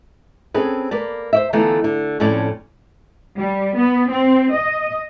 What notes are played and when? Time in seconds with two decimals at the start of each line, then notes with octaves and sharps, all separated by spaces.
0.54 C4 C#4 G#4 A4 B4
0.91 A#3 B4 D5
1.33 C5 D5 E5
1.53 D3 E3 A3 B3 D#4 F4
1.84 D3
2.20 F2 A2 C#4 D5
3.37 G3
3.76 B3
4.09 C4
4.53 D#5